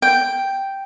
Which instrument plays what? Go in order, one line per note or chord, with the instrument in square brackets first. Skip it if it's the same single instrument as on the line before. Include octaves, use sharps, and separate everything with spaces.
[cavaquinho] G5